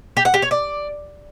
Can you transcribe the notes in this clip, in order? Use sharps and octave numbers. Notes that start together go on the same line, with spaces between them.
G4
F#5
G4
C#5
D5